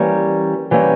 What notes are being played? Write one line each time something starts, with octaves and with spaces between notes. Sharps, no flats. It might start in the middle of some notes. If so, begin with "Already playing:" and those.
Already playing: E3 G3 A#3 C#4
E3 G3 A#3 C#4